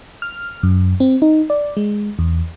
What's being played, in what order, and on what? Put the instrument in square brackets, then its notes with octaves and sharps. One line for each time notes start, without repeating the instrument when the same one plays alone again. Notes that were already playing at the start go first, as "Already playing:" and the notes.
[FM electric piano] F6
F#2
C4
D#4
D5
G#3
E2